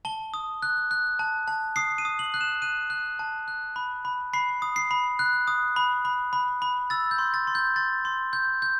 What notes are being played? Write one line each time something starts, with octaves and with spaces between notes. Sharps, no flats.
A5 G7
D#6
F#6
F#6
A5
A5
D#6 C7
D#7
D#6
F#7
F#6
E7
F#6 D#7
F#6
A5
F#6
B5
B5
B5 C7
D#6
C7
B5
F#6
D#6
B5
B5
B5
B5
E6 A6
G6
C6
A6
C6
G6
C6 A6
C6
G6
G6